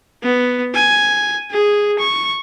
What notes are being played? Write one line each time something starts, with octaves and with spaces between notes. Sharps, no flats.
B3
G#5
G#4
C#6